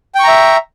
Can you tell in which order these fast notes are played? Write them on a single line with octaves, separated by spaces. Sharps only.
G5 C#6 A#5 E5